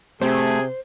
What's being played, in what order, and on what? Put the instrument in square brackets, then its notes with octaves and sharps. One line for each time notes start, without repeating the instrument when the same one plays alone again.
[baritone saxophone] C3 [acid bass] A3 [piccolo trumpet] G#4 [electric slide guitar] C5